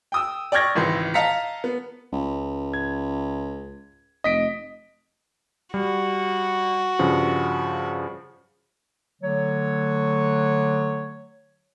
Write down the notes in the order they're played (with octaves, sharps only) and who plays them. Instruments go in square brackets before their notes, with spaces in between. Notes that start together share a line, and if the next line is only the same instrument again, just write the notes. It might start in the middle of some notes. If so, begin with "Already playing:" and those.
[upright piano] G5 D#6 E6
D5 G5 C#6 F6 G#6 A#6
G#1 C#2 E3 C6
D#5 F5 A5 A#5 B6 C#7
B3
[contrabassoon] C#2
[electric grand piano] G#6
[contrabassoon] F1 [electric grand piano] D#5 B6 D7
[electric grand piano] G3 [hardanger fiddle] F#4
[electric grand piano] G2 C#3 F3
[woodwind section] D3 F#3 A3 C#5